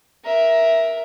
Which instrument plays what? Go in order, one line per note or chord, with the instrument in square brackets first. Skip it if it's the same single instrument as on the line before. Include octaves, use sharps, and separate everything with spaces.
[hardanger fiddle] A#4 E5